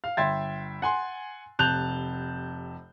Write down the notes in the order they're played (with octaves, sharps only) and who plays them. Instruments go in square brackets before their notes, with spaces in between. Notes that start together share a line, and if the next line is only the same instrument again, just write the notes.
[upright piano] F5
G1 E5 G5 C6 G#6 A6
F#5 G#5 C6
F1 C3 A5 F#6 G6 F7